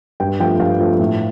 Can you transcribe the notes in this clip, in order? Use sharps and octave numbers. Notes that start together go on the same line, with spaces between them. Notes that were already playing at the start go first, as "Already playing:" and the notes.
G2 G5
F3 A3 G5
G2 F5
F3 A3
A2